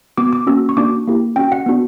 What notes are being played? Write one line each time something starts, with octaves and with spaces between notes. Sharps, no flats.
B3 F#4 D6
D6
A#3 C#4 F#4 E6
C#6
A#3 D4 F#4 D6
A#3 E4 G4
C#4 F#4 G5
F#5
B3 D4 F#4